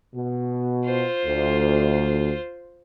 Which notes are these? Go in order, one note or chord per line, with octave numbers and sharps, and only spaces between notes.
B2
F4 C5
D2